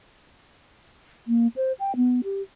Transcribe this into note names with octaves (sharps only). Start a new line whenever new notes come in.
A#3
C5
G5
B3
G4